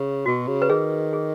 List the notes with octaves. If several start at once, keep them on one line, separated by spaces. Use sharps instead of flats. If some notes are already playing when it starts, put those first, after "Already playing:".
Already playing: C#3
B2 F#4
C#3
B4
D#3 G#4
G#4